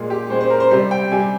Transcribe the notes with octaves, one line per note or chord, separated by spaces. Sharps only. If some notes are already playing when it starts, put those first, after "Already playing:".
Already playing: A#2 G#3
G4
A#2 G#3 C5
C5
A#4
C5
C3 G3 C5
G5
C3 G3 G#5